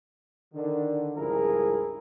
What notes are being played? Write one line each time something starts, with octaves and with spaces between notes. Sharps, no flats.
D3 D#3
C#2 G2 F3 E4 G#4 A#4